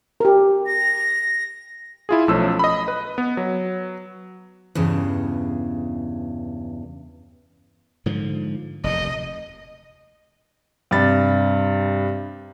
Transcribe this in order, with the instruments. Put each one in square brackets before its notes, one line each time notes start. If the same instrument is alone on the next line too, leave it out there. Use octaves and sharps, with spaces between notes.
[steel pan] G4 A#4
[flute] A#6
[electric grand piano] E4 F4 G#4
B1 F3 A3 C#4 E6
D#5 B5
B4
B3
F#3
[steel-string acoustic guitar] E2 G2 C#3
[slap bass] G#2 D3 F3
[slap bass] F1 D#2 A#2 [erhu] D#5
[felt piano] G2 C3 B5 A6